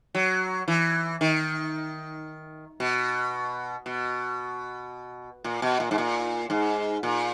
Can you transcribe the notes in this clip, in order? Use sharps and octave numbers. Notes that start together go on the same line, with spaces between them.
F#3
E3
D#3
B2
B2
A#2
B2
A#2
G#2
A#2
G#2
A#2